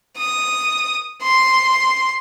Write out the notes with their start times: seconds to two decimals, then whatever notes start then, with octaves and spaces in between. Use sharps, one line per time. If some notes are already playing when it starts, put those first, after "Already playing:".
0.16 D#6
1.20 C6